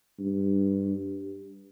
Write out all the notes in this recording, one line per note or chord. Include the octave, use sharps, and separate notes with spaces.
G2